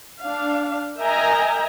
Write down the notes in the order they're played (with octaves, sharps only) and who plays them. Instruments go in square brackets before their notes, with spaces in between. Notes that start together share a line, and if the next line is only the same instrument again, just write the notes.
[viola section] D4 F5
A#4 D#5 E5 G5 G#5 A#5